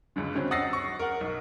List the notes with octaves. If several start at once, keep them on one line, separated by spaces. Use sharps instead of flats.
C#2 F#2 D3
D3 F#3 C4 C#4
F#5 D#6 E6 A6 A#6 C7
C#6
A#4 F#5
B1